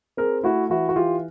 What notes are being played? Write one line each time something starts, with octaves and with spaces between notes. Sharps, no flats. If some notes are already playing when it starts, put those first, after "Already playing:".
C4 G#4 A#4
A3 E4 F#4
E3 E4 F#4
F#4
E3 F4 G4